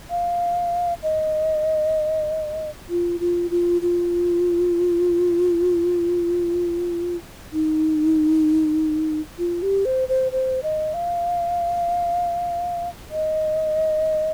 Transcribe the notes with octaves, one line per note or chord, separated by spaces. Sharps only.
F5
D#5
F4
F4
F4
F4
D#4
F4
G4
C5
C5
C5
D#5
F5
D#5